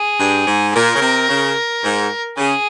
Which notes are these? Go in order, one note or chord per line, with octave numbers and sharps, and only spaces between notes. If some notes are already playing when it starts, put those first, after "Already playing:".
Already playing: G#4
G2
G#2
A#2 A#4
C#3
C3
C#3
G#2
C#3 G#4